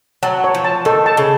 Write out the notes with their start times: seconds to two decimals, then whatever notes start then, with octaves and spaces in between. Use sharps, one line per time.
0.23 F#3 A5
0.44 C#5
0.55 F3
0.64 A5
0.85 D#3 A4
1.06 A5
1.17 C#3